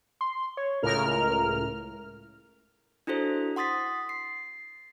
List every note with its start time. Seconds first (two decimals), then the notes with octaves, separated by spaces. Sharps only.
0.21 C6
0.57 C#5
0.83 C#2 A2 A#4 F6
3.07 D4 E4 F#4 A4 C5
3.56 F#5 C6 D#6 A6 B6
4.09 C7